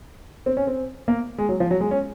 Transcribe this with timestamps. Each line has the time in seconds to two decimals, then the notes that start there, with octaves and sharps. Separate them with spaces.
0.46 C4
0.57 C#4
0.67 C4
1.08 A#3
1.38 G#3
1.49 F#3
1.60 F3
1.71 F#3
1.81 G#3
1.91 C#4